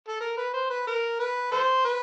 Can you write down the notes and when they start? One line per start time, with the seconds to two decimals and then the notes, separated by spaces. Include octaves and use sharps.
0.08 A4
0.21 A#4
0.38 B4
0.54 C5
0.70 B4
0.87 A#4
1.19 B4
1.52 A4 C5
1.85 B4